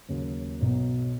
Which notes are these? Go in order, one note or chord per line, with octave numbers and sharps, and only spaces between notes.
D#2 C#3 F#3
B1 B2 F#3